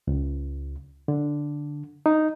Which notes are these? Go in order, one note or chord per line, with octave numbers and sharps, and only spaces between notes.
C#2
D3
D#4